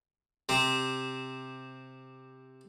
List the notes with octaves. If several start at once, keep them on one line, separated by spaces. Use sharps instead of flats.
C3 C4